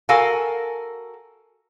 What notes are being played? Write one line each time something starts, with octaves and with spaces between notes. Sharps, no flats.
F#4 A4 A#4 F5 G#5